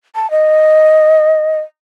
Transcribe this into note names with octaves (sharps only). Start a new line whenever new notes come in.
A5
D#5